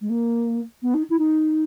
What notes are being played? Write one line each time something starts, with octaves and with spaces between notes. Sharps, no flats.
G#3
A#3
B3
D#4
E4
D#4